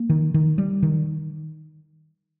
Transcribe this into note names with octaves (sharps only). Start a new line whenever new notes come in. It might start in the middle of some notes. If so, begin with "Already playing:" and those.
Already playing: A#3
D#3
D#3
G3
D#3